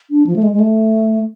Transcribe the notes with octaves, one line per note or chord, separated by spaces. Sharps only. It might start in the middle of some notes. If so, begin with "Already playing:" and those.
D4
F3
A3
G#3
G#3
A3